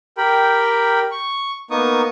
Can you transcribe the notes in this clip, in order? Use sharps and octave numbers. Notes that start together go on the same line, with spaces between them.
G4 A#4 G5 B5
C#6
A#3 B3 D#4 C#6 D#6